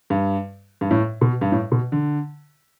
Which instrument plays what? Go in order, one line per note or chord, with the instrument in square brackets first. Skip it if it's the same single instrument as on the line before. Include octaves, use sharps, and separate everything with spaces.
[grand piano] G2
G2
A2
B2
G2
A2
B2
D3